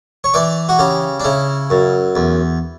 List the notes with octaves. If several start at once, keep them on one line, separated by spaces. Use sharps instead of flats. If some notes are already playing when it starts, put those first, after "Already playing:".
C#5
E3 D5
F#4
C#3 G4
D4
C#3 E4
F#2
E2